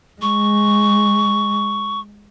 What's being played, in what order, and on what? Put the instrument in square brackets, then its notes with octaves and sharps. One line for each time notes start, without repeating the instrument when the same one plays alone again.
[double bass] G#3 [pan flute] C#6